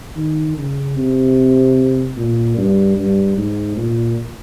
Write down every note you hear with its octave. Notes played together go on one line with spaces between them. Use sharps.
D#3
C#3
C3
A#2
G2
G2
G#2
A#2